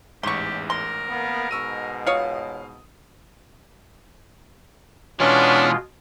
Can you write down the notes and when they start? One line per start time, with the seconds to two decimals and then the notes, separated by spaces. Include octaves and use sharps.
0.23 A1 E2 G#2 G4 C6 C#6
0.70 A#4 C6
1.10 A#3 B3
1.51 G#2 B2 C#6 E6 D#7
2.07 F4 C#5 F5 D#6
5.20 B2 E3 G#3 B3 C#4 D4 F4